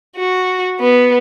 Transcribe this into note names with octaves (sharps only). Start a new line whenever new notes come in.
F#4
B3